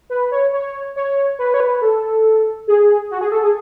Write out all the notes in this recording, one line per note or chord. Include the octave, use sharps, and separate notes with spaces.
B4
C#5
C#5
C#5
B4
C#5
B4
A4
G#4
F#4
G#4
A4
G#4